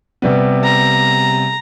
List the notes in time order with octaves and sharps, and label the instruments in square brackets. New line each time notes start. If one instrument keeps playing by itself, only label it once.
[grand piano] C3 G3 B3
[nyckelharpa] A#5